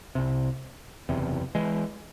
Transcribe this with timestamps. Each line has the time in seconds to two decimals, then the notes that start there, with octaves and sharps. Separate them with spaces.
0.15 C2 C3
1.09 F#1 E2 C3
1.55 E3 G#3